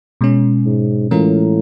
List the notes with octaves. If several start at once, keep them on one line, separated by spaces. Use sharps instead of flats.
B2 G#3 C#4
G#2
A2 E3 G#3 C#4 F4 A#4